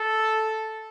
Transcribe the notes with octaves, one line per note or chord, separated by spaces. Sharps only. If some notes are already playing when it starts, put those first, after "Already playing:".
Already playing: A4